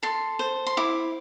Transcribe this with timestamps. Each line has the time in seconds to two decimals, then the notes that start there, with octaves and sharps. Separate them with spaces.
0.03 A4 C6
0.39 C5
0.67 C6
0.77 E4 D6